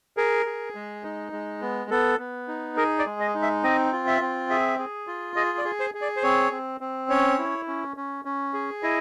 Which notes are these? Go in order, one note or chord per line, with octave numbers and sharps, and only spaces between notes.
G#4 A#4
G#4
G#3
D#4
G#3
B3
B3 A4
B3
D#4
G#4 A#4
D5
G#3
D#5
D#4
E5
C4 D#5
F4
E5
C4
G#4 E5
G#4
F4
G#4 D#5
D5
G#4
C5
G#4
D5
C5
C4 C#5
C4
C4
C#4 C#5
E4
C#4
C#4
C#4
G#4
E4 D#5